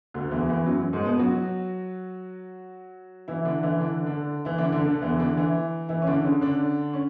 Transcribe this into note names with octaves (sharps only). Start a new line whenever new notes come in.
D2 D3
E2 E3
E2 E3
F#2 F#3
G#2 G#3
B2 B3
F#3 F#4
E3 E4
D3 D4
E3 E4
D3 D4
D3 D4
E3 E4
D3 D4
D3 D4
D3 D4
E2 E3
D3 D4
E3 E4
E3 E4
C#4
D3 D4
C#3 C#4
D3 D4
C#4